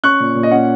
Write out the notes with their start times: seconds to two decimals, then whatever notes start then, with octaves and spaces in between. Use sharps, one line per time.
0.03 C#4 C#6 F#6
0.20 A#2
0.35 A#2
0.43 D#5
0.51 C#4 F#5